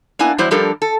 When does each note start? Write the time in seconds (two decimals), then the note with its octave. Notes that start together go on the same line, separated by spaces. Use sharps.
0.19 A#3 B3 D4 E4 G#5
0.38 E2 F#3 G3 E4 C5
0.51 F3 G3 D4 G4 A4 A#4
0.82 A4